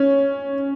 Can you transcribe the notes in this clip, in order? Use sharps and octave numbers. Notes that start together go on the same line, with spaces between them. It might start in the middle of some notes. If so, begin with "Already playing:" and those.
Already playing: C#4